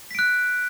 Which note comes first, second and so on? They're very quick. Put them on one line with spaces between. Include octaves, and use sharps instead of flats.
B6 D7 F#6